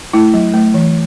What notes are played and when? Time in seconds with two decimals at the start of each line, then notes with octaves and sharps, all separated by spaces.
0.14 A3 E4
0.34 F#3
0.54 A3
0.74 E3